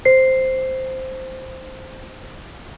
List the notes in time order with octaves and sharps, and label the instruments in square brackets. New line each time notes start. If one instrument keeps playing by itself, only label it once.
[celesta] C5 C7